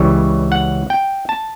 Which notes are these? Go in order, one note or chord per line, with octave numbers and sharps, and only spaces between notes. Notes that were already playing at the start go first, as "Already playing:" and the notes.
Already playing: C#2 C#3 E3 G3 C#5
F#5
G5
A5